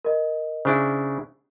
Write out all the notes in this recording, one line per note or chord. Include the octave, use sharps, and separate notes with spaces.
A#4 D#5
C#3 D4 E4 C5